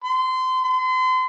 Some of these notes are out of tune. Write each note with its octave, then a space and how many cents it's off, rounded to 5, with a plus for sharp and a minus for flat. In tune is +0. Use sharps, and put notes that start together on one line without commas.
C6 -25
C6 -35